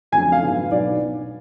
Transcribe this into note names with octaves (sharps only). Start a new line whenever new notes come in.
F2 C#3 F#3 A3 D4 G#5
F5
G#2 F#3 B3 D4
B1 B2 F#3 B3 D5